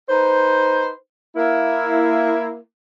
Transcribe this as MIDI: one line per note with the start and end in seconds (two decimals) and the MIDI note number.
0.10 0.90 63
0.10 0.90 71
0.10 0.90 72
1.36 2.55 58
1.36 2.55 64